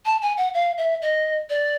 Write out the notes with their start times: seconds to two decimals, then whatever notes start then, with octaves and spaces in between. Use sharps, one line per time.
0.05 A5
0.22 G#5
0.37 F#5
0.54 F5
0.78 E5
1.02 D#5
1.50 D5